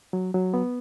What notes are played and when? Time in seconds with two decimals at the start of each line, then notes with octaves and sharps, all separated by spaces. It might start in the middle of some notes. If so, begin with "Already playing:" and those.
0.13 F#3
0.34 F#3
0.54 B3